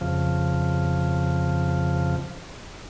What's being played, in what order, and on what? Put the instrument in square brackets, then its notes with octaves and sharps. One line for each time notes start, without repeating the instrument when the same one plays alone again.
[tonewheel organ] F2 C#3 F3